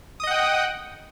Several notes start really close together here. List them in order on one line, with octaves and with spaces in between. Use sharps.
D#6 D#5 F#5 G5